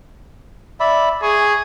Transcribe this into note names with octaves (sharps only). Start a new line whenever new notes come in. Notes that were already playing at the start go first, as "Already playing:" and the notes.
D5 E5 B5
G#4 C#6